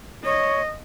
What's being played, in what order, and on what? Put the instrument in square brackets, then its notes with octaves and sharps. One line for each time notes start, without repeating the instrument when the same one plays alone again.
[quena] C#5 [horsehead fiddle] D#5